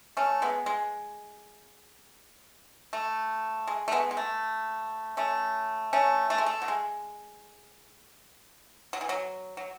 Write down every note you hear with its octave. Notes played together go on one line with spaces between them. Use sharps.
A3 C#4
G#3 B3
G#3
A3
G#3
A3
G#3 B3
G#3
A3
A3 C#4
A3 C#4
A3
G#3
A3
F#3
G#3
F#3
E3
F#3
F#3